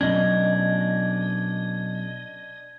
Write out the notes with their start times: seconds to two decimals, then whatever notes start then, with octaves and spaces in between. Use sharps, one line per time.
0.01 B2 F#3 C#4 D4 D#5 G#6